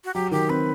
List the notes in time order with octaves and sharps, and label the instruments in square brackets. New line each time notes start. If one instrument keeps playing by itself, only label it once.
[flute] F#4
[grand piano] F#3 [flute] G4
[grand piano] D#3 [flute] G4
[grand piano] C4 [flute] B4